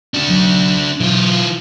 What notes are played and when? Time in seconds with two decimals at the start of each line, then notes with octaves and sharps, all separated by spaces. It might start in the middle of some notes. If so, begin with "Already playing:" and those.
0.14 D4 F#4
0.28 B1 F#3
1.00 B2 E3 F#3 F4